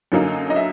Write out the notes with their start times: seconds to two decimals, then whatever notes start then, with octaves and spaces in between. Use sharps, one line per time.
0.12 F#2 D3 F#3 A#3 D#4
0.50 D#5
0.56 E5